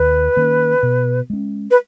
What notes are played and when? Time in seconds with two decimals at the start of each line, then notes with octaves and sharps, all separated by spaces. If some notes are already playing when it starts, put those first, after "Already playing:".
Already playing: D#2 B4
0.36 D#3 A#3 C#4
0.83 B2
1.30 G#3 C#4
1.71 B4